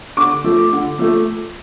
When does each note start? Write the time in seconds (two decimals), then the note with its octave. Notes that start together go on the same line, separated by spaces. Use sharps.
0.17 D3 D6
0.44 F3 A3
0.72 D3
0.99 F3 A3